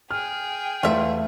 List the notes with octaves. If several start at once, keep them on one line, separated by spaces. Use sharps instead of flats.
G#4 G5 F6
E2 A3 B3 F4 E5